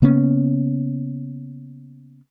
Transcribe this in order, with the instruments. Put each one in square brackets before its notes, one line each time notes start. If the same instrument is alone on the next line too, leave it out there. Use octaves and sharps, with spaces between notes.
[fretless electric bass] C#3 A#3 B3 C#4